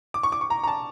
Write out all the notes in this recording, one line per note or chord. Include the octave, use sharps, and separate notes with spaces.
D6
C#6
D6
C#6
A#5
A#5
A5